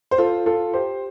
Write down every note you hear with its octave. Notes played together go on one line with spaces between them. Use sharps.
C5
F4 A4
F4 A4
G4 C5